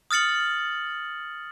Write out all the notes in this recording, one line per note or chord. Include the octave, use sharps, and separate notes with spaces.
D#6 F6 A6 C#7 F#7